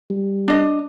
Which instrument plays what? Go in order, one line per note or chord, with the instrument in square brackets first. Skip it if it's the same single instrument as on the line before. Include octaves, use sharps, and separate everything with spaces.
[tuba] G3
[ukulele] D4 D#5